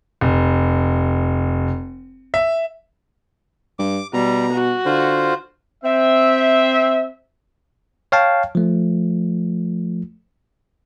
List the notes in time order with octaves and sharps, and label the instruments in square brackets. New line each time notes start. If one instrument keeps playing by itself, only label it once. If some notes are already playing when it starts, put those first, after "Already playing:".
[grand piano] F1
E5
[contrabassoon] G2 [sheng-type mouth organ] D6
[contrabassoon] B2 [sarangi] G3 [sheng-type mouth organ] A#5
[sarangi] F#4
[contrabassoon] D3 [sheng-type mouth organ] F4 C5
[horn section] C4 E5
[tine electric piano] C#5 F5 G5 A5
F3 A3